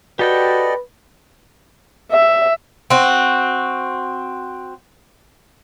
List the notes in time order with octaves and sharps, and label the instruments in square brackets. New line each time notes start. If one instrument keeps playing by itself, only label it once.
[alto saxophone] F#4 [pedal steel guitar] G4 A4 G5 [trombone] B4 [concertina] D5 D#5
[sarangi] E5
[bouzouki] C4 F#4